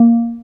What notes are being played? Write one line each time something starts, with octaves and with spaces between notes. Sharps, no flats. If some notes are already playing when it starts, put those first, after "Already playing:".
Already playing: A#3